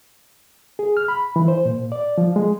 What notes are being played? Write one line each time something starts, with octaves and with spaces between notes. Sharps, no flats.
G#4
F6
B5
E3
C5
A#2
D5
F3
G#3